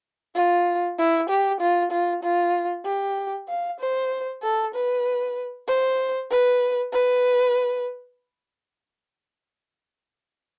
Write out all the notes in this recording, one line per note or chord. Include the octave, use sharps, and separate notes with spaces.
F4
E4
G4
F4
F4
F4
G4
F5
C5
A4
B4
C5
B4
B4